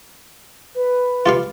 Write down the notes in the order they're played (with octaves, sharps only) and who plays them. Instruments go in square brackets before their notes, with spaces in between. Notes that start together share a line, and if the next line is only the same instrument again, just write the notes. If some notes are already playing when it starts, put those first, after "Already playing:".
[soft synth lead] B4
[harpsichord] F4 G4 F5